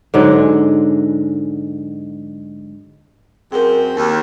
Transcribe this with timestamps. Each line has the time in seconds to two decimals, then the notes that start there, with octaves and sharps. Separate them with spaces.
0.14 G#2 D3 F#3 G#3
3.52 F#2 C4 G#4 A#4
3.96 D#2